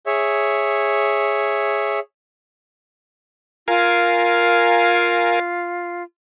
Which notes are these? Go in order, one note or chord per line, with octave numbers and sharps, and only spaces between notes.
G#4 C#5 E5
F4 A#4 F5 G#5